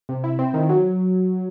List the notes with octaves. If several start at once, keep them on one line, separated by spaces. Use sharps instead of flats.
C3
E4
C4
D#3
F#3